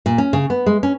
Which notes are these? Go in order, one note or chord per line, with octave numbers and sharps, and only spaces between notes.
A#2
C#4
C#3
B3
G#3
C#4